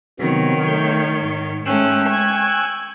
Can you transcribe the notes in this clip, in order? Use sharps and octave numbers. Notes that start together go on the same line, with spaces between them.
C3 D#3 F#3 B3 C#5
A3 G6
G#2
G#3 A3 C#4 G5 E6 F#6
G#5 C#6